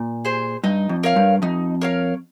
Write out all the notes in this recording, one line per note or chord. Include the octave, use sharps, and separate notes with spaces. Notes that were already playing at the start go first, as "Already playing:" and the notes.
Already playing: A#2
G#4 C5
G2 D#4
F2
A#4 C#5 F5
G2
F2 D#4
A#4 C#5 F5